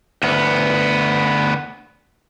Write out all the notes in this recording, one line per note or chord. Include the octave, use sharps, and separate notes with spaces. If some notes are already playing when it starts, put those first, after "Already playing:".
D2 B3